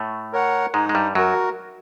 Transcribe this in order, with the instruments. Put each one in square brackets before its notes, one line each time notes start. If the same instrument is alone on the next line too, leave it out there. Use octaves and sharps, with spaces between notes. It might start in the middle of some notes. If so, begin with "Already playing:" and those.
Already playing: [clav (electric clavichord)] A2 A3
[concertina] A#4 C#5 F#5
[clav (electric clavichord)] G#2 G#3 [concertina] D#4
[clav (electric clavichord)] G#3
G2 G3
[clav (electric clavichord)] F#2 F#3 [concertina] F#4 A#4